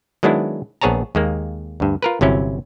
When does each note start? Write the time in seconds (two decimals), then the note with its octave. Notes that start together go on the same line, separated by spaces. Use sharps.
0.23 D#3 F#3 G#3 B3 D4 E4
0.81 A#1 B3 G#4 C#5 A5 A#5
1.15 D#2 G#3 A#3
1.80 D2 G2
2.02 F4 A#4 B4
2.21 G1 C3 F#3 C#4 E4